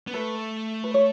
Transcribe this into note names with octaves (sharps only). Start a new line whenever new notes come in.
B3
A3 B4
B4
C#5